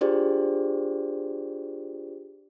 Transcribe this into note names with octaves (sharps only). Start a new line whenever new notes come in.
D4 F4 G4 G#4 C5 D5